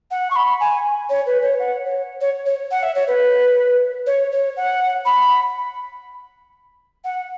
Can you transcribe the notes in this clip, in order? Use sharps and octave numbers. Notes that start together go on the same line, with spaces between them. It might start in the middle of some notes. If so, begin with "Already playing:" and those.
F#5
C#6
B5
G#5
C#5
B4
C#5
F#5
C#5
C#5
C#5
F#5
E5
C#5
B4
C#5
C#5
F#5
B5
F#5